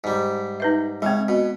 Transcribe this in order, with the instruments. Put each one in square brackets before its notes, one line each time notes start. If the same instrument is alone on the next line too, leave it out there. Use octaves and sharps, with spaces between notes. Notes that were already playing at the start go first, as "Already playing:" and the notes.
[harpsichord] G#2 G3
[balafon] D#4 B4 E5
[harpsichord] C#3 [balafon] G#3 C4
[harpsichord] B2